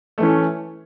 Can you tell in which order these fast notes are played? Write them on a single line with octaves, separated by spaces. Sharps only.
A3 E3 C#4